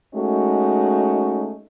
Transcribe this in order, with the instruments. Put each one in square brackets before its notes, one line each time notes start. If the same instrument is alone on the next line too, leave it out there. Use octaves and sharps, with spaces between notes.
[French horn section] G#3 A3 C#4 D#4 F#4